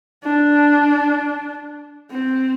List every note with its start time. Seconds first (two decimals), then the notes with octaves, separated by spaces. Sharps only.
0.23 D4
2.11 C4